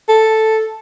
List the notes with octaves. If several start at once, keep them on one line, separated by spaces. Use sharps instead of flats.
A4